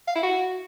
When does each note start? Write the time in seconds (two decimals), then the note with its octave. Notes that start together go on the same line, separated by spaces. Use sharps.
0.08 F5
0.15 E4
0.23 F#4